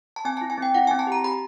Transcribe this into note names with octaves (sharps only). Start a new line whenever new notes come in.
A5
C4 G#5
E4 A5
G#5
C4 G5
E4 F#5
C4 G#5
A5
G4 A#5
G4 B5